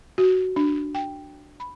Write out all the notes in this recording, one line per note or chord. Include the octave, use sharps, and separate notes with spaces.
F#4
D4
G5
B5